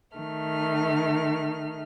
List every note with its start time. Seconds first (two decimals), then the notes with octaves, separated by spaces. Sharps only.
0.16 D#3 A3 F6